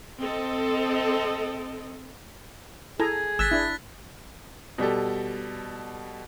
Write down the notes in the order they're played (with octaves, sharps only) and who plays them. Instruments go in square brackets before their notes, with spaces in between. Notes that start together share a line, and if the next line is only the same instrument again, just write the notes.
[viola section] C4 A4 D#5
[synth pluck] E4 [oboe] G#4 [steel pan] A4 G#5 A#5
[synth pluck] G#1 [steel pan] E6 [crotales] F#6 A6 B6
[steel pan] D4 E4
[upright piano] B2 G3 G4 A4